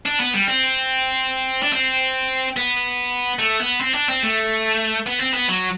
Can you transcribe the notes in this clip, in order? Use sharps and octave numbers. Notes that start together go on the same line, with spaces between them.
D4
B3
G3
C4
D4
C4
B3
A3
B3
C4
D4
C4
A3
B3
C4
B3
F#3